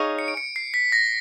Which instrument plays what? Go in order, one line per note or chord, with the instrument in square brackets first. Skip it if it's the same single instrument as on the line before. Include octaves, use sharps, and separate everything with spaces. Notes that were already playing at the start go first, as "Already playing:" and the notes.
Already playing: [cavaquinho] D#4 G#4 C#5 F5
[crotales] C#7
D7
C#7
C7
B6
A#6